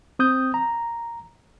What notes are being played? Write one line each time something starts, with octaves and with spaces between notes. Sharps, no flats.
C4 D#6 G6
A#5